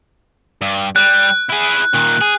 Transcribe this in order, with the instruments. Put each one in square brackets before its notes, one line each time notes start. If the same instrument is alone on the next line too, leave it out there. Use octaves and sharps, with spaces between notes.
[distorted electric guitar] G2
[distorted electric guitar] G3 [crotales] F#6
[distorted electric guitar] E4 G#4
A#2 D#3
G#4